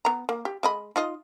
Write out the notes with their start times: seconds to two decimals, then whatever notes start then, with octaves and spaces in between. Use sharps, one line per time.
0.05 B3 A#5
0.29 A#3
0.45 G4
0.63 G#3 D#5 B5
0.96 D#4 F4 D#5